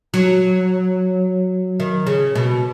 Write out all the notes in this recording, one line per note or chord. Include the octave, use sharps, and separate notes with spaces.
F#3
D#3
C#3
B2